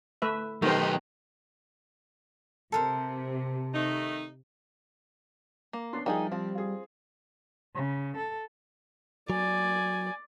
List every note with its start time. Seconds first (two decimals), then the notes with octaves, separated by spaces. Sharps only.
0.22 A3 B4 E5
0.62 D#3 F#3 A3 B3 D#4 G4 C5 D#5
2.72 C3 A4 A#4 C5
3.74 D#3 A3 D#4
5.73 A#3
5.93 B3 C#4 D4 C6
6.06 D#3 F3 G3 D#4 G#4 E5
6.32 F3 C4
6.55 F4 G#4
7.75 C#3
8.17 A4
9.30 F#3 D5 G#5